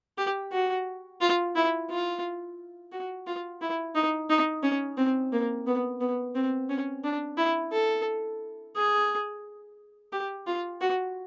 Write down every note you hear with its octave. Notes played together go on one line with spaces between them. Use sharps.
G4
F#4
F4
E4
F4
F#4
F4
E4
D#4
D#4
C#4
C4
A#3
B3
B3
C4
C#4
D4
E4
A4
G#4
G4
F4
F#4